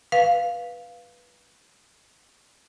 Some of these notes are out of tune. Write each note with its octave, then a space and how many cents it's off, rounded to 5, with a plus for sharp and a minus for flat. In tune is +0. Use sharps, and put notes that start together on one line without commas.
B4 -10 F5 +0